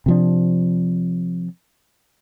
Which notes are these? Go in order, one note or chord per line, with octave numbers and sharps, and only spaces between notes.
C3 F3 D4